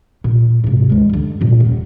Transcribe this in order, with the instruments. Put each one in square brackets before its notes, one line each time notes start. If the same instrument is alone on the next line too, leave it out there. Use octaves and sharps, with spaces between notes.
[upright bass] A#2
G#2 C3
D2 G#3
G2 D3
F#2 A#2
D#1